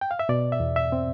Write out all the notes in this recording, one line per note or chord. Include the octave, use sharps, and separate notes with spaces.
G5
F5
E5
B2 D5
E5
E2
E5
C4